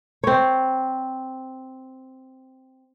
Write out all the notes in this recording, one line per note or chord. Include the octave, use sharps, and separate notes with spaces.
C4 C#5